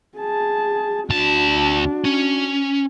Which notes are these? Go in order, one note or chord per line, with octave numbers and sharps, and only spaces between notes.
G#4 A5
D2 D4 F#4 A5
C#4